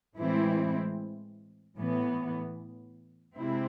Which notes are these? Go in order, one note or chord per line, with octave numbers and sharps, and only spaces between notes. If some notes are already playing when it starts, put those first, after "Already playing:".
A2 E3 G#3 C4 E4
A2 E3 B3
C3 G#3 C4 E4